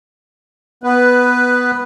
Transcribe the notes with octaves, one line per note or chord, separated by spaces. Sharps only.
B3 B4